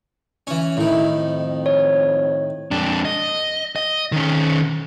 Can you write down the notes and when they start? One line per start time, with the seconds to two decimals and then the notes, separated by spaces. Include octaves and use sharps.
0.47 E3 C#4
0.77 A2 D#3 E4
1.16 F2
1.66 C#5
2.71 F2 D4
3.05 D#5
3.76 D#5
4.12 D#3 C#4